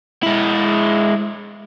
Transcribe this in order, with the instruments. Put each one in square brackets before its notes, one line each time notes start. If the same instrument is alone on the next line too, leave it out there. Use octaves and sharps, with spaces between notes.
[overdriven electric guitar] G#3 E4